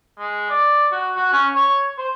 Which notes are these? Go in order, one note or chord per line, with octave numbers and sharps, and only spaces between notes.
G#3
D5
F#4
F#4
C#4
C#5
C5